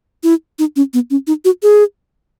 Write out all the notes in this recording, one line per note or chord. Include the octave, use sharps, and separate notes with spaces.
E4
D#4
C#4
B3
C#4
D#4
F#4
G#4